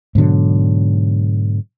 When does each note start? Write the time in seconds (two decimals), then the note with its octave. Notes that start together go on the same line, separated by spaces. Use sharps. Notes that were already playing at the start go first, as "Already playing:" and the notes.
0.15 G#2 B2 D3 F#3